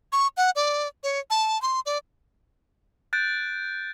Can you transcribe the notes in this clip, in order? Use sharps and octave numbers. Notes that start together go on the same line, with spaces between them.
C#6
F#5
D5
C#5
A5
C6
D5
F#6 G6 A6 D7